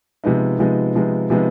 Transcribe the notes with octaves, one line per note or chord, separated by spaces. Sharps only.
C3 F3 G#3 B3 D#4
C3 F3 G#3 B3 D#4
C3 F3 G#3 B3 D#4
C3 F3 G#3 B3 D#4